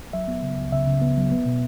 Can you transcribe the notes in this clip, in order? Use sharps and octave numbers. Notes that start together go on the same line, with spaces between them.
F#3 E5
B3
C#3
C#2
C#3 E5
C#3
B3
F#3
B3
B2